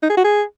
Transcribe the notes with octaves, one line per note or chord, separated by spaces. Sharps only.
D#4
G#4
F#4
G#4